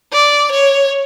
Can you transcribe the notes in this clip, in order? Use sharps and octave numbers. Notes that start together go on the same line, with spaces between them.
D5
C#5